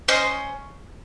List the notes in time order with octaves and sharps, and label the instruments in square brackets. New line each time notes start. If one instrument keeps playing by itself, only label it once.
[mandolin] C#4 C5 D#5